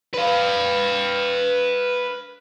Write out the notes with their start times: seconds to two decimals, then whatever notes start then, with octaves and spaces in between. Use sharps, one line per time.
0.14 B4 F5